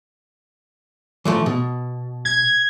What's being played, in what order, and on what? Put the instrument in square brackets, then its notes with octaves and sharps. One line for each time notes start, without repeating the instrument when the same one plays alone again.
[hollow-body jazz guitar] E3 F3 A3
B2
[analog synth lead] G#6